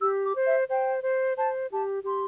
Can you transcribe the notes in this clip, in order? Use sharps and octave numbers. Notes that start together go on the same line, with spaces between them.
G4 E6
D6
C5
E5
C5 G5
C5
C5 A5
G4 A5
G4 C6